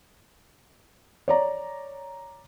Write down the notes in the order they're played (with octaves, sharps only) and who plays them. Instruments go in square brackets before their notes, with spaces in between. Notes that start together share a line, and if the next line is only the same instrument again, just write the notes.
[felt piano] C#5 D5 A#5